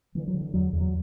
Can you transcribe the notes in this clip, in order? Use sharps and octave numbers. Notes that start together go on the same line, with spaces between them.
D3 E3
F#3
D3
E3
E2 F#3
E2
F#3